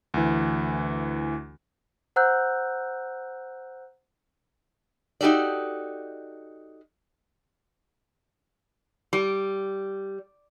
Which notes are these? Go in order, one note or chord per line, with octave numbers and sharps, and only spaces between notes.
D2 E3
C5 F#5 A#5 E6 F#6 G6
D#4 F#4 G4 A4 D5
G3